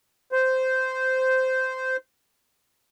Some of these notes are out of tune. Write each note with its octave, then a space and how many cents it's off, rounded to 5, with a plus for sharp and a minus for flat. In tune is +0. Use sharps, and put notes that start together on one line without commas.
C5 -10